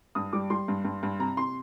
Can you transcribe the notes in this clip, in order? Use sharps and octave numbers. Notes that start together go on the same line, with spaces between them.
G2 D#6
G3 D6
G3 C6
G2
G2
G2
C3 A#5
C3 C6